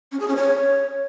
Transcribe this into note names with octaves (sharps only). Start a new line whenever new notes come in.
C#4
G#4
C#4
C#5